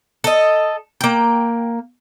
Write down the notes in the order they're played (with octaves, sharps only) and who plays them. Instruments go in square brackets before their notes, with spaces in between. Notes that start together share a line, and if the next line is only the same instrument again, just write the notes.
[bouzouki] A4 D#5
A#3 G5